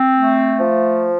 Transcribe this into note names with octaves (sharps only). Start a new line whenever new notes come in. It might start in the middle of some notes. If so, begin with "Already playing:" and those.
Already playing: C4
A3
F3